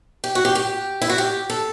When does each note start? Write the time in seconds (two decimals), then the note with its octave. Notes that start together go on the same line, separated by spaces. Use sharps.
0.24 G4
0.35 F#4
0.45 G4
0.55 G4
1.02 E4
1.09 F#4
1.18 G4
1.50 A4